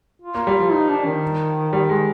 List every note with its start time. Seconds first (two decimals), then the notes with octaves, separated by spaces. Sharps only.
0.22 F4
0.35 A#3
0.47 G3
0.60 F3
0.72 D#4
0.89 D4
1.06 D#3
1.73 G3
1.89 G#3